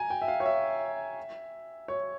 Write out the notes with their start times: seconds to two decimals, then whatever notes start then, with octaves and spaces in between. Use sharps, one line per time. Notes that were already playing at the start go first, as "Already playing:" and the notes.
Already playing: G#5 A#5
0.10 G5
0.22 E5
0.28 F5
0.40 C#5
0.46 E5
1.88 C#5